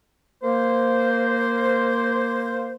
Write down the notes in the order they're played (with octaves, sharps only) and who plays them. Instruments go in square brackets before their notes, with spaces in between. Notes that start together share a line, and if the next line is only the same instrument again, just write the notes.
[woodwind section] A#3 C5